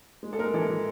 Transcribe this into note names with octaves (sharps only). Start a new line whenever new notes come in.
G#3
A4
G#3 A#4
E3 A4
E3